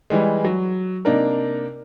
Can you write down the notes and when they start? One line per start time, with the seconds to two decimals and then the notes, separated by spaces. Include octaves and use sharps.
0.10 E3 G3 G#3
0.45 F#3
1.05 C3 A#3 D4 D#4 A#4